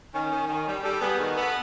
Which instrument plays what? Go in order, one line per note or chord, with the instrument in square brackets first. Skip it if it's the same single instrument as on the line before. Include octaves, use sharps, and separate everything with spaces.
[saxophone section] D#3 [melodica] C#4
[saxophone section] D#3
D#3
G3
[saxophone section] G3 [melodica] A4
[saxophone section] B3 [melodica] G#4
[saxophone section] D#3 [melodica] F#4
[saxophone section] B3 [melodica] A4